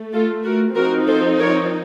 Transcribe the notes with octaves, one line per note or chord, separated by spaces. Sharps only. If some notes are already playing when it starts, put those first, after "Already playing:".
Already playing: A3
F4 A4
F#4 A#4
F3 C4 D#4 F#4 A#4
A4 C5
A#4 C#5